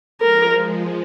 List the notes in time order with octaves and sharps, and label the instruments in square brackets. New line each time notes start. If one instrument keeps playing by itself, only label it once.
[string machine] F3 G#3 [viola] A#4